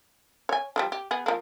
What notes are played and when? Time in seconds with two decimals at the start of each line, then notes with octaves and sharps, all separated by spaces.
0.49 C#5 G#5
0.76 D#3 F3 G3
0.92 G4
1.11 B3 G#4
1.26 F3 A#3